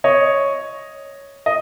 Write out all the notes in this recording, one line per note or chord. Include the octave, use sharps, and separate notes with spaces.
C#5 D#5
D#5